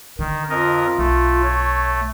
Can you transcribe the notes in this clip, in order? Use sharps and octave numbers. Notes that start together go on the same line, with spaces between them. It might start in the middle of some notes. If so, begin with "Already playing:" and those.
D3 D#3
F2 F4 A#4 D#5
B1 A3
C#5